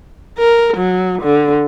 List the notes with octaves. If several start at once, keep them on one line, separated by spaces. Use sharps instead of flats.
A#4
F#3
D3